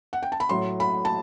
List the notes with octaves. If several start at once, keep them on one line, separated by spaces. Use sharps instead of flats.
F#5
G5
A5
B5
A2 F#3 C6
B5
A5